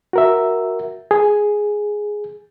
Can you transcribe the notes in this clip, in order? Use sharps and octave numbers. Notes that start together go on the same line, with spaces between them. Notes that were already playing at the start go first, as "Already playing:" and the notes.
F#4 A#4 E5
G#4